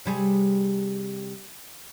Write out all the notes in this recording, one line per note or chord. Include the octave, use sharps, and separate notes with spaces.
C3 G3 G#4